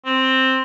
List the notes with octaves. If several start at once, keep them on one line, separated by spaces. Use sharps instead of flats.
C4